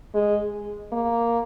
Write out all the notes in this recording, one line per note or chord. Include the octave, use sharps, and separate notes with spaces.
G#3
A#3